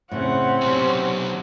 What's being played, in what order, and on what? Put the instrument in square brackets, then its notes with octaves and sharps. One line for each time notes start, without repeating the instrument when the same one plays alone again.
[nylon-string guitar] A2 C#3 [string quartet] C4 [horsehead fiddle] C#4 F#5
[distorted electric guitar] B1 F#4 [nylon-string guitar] C3